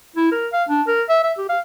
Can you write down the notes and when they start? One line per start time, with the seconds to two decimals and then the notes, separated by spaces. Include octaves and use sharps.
0.16 E4
0.32 A#4
0.53 F5
0.69 D4
0.88 A#4
1.09 E5
1.23 E5
1.38 G4
1.49 F5